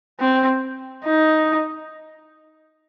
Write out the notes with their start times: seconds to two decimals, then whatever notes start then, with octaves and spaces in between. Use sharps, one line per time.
0.20 C4
1.04 D#4